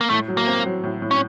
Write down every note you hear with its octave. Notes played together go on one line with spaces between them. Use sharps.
A#3
A2 A3
F#3
A#3
C4
F#3
A2
A2
C#4